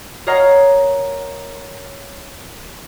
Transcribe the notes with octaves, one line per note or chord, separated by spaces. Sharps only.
A#4 C#5 D#5 F5 F#5 A#5